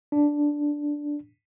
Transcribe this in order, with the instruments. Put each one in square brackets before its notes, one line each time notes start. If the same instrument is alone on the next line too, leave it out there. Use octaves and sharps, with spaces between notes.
[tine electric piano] D4